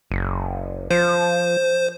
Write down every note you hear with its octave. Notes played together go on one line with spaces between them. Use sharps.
F#1
F3 C5